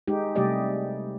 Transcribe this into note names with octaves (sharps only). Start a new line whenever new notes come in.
G#3 D#4 G4
C3 G3 A3 G4 D5 D#5